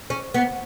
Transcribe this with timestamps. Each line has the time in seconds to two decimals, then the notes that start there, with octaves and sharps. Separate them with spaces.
0.10 C#4
0.34 B3